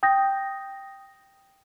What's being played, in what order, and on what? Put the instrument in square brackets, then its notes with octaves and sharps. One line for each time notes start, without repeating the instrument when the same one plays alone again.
[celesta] G5 D#6 G6 A#6